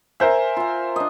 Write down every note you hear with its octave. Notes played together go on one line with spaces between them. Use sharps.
A#4 C5 E5 G#5
F4 G#5
D4 D#5